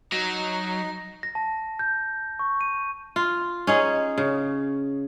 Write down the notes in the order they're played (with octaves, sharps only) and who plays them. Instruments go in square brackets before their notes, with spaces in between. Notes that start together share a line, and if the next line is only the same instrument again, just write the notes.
[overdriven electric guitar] F#3 [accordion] D#4 [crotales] A#6
[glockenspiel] A#6
A5
G6
C#6
D#7
[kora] F4
C#4 D#4 G#4
C#3